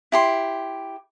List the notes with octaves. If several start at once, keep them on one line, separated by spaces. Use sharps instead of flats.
E4 G4 C6